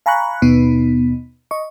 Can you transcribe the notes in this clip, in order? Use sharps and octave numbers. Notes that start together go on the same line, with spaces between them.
F5 G#5 A#5 B5 C#6 F#6
D#2 B2 B3 D#4
D#5 C#6